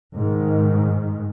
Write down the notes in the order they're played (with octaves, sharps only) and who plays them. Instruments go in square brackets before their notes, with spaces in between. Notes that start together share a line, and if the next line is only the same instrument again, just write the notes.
[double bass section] G#2 D#3